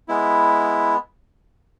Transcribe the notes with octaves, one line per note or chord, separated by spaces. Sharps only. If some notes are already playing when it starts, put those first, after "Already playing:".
G#3 B3 E4